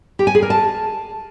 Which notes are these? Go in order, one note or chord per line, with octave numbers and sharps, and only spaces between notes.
G4
G#5
G#4
A#4
A5